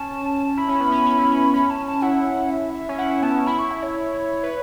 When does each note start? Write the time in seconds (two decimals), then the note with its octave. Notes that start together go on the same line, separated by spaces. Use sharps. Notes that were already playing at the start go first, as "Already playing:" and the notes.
Already playing: C#4 A5
0.57 E4 B5
0.68 C#4
0.80 B3
0.92 C#4
1.06 C#4
1.18 E4
1.31 C#4
1.54 C#4 B5
1.70 A5
1.87 A5
2.02 E4 F#5
2.50 E5
2.74 E5
2.89 C#4
2.98 E4 F#5
3.10 E4
3.22 B3 A5
3.35 C#4
3.47 E4 B5
3.59 C#6
3.71 E5
3.83 C#5
4.43 B4